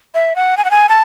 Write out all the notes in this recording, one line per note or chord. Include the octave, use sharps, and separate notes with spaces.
E5
F#5
G#5
F#5
G#5
A5